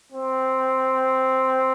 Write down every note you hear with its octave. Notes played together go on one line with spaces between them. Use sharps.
C4